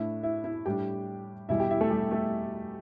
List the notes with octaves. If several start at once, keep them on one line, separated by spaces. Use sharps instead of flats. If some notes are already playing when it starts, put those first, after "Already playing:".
Already playing: A2 A3 D4 E4
E4 E5
E4 E5
A2 G3 D4 G4 G5
E2 B2 G3 E4 E5
G4 G5
E4 E5
A3 A4
G3 G4
A3 A4